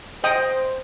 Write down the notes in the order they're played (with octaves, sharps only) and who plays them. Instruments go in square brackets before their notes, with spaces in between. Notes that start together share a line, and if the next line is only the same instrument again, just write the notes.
[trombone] C5 [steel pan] D#5 G5 D#6